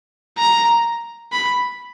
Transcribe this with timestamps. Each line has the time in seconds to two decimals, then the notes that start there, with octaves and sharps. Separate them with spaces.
0.38 A#5
1.33 B5